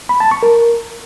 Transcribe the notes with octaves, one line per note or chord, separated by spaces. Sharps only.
B5
A5
C#6
A#4